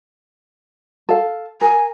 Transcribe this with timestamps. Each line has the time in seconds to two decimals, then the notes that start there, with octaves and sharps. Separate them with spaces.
1.09 A4 F5
1.61 A#4 G#5